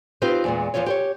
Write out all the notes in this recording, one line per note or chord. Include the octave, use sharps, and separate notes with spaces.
C4 D#4 F4 G4 B4 C5
E2 A#2 G#3
E2 A2 F3 F4 C#5
G4 C5 C#5